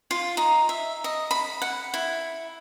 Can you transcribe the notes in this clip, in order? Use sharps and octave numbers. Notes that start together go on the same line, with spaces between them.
F4
D#4
E5
D#5
B5
F#5
E4